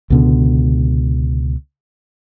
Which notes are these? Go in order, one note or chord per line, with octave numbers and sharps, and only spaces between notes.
C#2 B2 D3